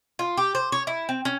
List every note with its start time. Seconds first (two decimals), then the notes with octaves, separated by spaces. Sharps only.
0.19 F4
0.37 G4
0.55 C5
0.72 C#5
0.87 E4
1.09 C4
1.25 C#4